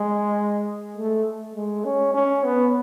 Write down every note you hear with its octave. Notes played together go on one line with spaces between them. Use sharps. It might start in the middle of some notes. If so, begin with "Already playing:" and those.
Already playing: G#3
A3
G#3
C#4
C#4
B3